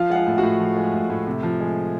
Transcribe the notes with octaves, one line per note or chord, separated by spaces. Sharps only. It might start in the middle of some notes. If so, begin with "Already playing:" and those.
Already playing: F3 F4 F5
G#3 F#5
F4 F5
A2
F#4 F#5
A2
F3
G#3
A2
A2
C3
F3
G#3